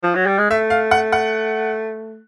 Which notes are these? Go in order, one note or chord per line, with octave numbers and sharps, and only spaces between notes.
F3
F#3
G3
G#3
A3 E5
F5
F#5
F#5